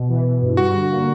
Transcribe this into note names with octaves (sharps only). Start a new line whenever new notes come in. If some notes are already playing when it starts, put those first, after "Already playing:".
Already playing: B2
E3
E3
G2
G3 F#4
D3
A#3